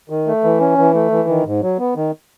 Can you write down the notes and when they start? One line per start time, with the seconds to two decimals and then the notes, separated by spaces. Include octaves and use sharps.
0.10 D#3
0.27 A3
0.44 E3
0.60 C#4
0.78 E3
0.94 A3
1.11 E3
1.29 D#3
1.46 G#2
1.62 F#3
1.79 B3
1.96 D#3